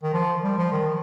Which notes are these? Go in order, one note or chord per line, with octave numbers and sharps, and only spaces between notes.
D#3
F3
G3
F3
D#3